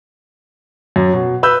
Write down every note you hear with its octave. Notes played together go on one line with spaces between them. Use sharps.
F#2
B2
B4 E6 G6